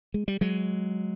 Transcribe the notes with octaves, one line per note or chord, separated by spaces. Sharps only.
G#3
G3
F#3 G#3